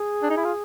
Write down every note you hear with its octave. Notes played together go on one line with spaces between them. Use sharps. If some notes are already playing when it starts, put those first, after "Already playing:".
Already playing: G#4
D4
D#4
E4
F4